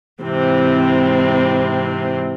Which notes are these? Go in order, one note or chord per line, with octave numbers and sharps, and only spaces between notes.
G#2 C3 E3 C4